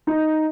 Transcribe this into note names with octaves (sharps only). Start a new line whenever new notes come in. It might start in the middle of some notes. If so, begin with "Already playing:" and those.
D#4